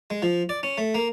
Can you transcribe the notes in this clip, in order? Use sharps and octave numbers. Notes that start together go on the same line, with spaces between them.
G#3
F3
D5
C#4
A3
A#3